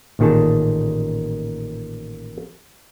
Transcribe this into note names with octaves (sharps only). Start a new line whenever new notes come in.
A1 A#2 D#3 G#4 A5